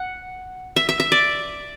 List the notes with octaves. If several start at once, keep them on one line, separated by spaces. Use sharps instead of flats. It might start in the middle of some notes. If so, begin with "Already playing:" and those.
Already playing: F#5
E5
E5
E5
D5